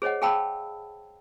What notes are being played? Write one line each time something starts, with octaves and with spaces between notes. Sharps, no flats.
G#4 C5 C#5 D#5 F#5
G#4 F5 G5 A5 B5 E6